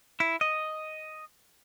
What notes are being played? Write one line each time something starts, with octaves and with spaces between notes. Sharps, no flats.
E4
D#5